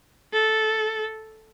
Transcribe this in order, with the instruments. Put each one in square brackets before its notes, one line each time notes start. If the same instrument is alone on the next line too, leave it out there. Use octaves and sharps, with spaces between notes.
[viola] A4